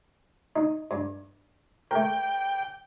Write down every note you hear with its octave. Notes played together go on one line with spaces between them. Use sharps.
D#4
G2
A3 A#4 G5